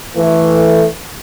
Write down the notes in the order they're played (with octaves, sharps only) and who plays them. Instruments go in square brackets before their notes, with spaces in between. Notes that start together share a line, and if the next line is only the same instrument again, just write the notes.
[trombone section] E3 A3